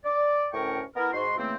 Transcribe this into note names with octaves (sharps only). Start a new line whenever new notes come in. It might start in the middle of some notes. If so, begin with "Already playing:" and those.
D5
D2 A2 C#4 A#4 G5 C#6
B3 E4 A#4
G#2 F#4 C6
C#3 E3 A3 A#3 C4